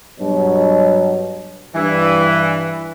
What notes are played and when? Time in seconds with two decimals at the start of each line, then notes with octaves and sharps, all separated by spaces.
0.20 G2 B2 F#3
1.75 G2 E3